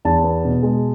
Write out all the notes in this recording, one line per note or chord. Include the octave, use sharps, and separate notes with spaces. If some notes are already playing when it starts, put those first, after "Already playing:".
E2 A5
B3
B2
G#3